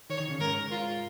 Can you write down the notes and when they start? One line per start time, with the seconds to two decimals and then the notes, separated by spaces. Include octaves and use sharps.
0.10 D#3 C#5
0.20 D#3
0.30 C#3
0.40 G#2 A#4
0.71 F4